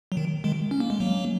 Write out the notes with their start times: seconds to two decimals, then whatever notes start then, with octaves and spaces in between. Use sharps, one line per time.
0.12 F#3
0.17 D#3
0.44 D#3 G#3
0.71 C#4
0.80 A#3
0.90 G#3
1.00 F#3 A#3